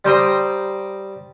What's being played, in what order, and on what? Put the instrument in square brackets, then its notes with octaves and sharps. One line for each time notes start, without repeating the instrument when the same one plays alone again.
[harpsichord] G3 C5 G5 A#5 C6 D#6